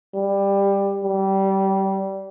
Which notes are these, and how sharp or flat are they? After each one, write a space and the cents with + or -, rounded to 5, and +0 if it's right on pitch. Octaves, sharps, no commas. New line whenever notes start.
G3 +15
G3 -20